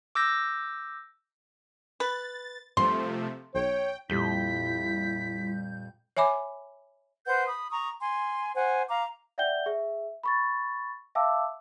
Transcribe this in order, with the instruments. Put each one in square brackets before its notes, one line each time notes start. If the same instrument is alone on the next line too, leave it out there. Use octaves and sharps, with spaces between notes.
[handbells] D6 E6 G6 A#6
[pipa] B4 [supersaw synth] A6
[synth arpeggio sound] G2 [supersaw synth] C3 F3 A3 [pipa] C6
[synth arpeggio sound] B1 [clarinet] C#5 [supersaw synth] G5
[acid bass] F2 [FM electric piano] A#2 G3 G6 [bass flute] E4 [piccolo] B6
[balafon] C#5 E5 G#5 B5 D6
[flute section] B4 C5 F#5 G6
B5 D#6
A#5 C#6 D#6
G#5 C6
C5 F#5 G#5
F5 A#5 D6
[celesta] D5 E5 F#5 G5 G6 G7
G#4 E5
B5 C#6 A6
E5 F5 G5 A5 D6 E6